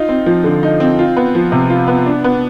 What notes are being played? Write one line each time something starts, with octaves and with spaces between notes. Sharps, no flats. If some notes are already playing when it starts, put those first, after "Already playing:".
Already playing: D#4 F4
C4
F3
D3
D#4
C4
F4
B3
F3
C3
F4
B3
D4
B3